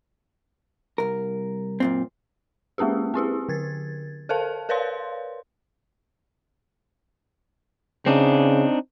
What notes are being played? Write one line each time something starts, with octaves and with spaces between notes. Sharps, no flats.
C2 G2 A#4
F#2 A#2 C4
G#3 A#3 C#4 G4 G#4
C4 E4 G4 G#4
D3 G#6 A6
A4 A#4 C5 F5 A5
A#4 B4 C#5 D5 F5 C6
C#3 C4 D4 D#4